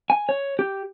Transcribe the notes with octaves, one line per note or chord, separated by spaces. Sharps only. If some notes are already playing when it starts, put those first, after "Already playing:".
G#5
C#5
G4